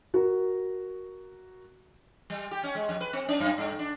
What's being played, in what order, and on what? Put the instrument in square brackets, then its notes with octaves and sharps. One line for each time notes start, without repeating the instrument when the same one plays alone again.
[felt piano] F#4 A#4
[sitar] G3
G4
C#4
G#3
F2
B4
C4
C#4
F#2
G2
D4